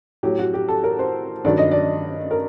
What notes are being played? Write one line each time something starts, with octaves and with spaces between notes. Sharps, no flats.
A2 F#3 G4
F#4
G4
A4
A#4
C5
G2 D#3 F#3 D5
D#5
D5
A#4